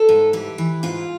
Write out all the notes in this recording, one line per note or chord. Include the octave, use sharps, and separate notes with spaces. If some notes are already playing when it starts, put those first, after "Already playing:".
Already playing: A4
G#2
E3 G4
E3
G#2 F4